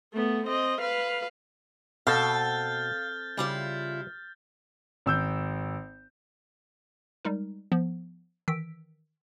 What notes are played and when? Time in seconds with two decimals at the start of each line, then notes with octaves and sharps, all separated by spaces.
0.13 A3 B3
0.47 C4 D#5
0.81 B4 F5
2.07 B2 C4 A4 F5 F6 G6 A6
3.37 C#3 G3 E4 F4
5.06 G#1 E6 G6
7.25 G3 G#3 D#4 A#4
7.72 F3 B3
8.48 D#3 E3 E6 B6 D7